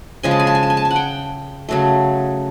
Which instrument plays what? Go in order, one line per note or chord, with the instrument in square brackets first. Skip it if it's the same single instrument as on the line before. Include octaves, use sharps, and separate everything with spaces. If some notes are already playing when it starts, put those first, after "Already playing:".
[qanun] C#3 F3 G#3 G#5
A5
G#5
A5
G#5
A5
G#5
A5
G#5
F#5
G5
C#3 F#3 A3